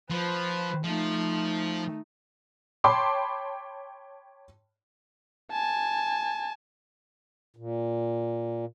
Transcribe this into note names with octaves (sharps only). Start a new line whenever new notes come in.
F3 B4 C5
F3 A3 D#4
C#5 G5 A5 B5 C6 D6
G#5 A5
A#2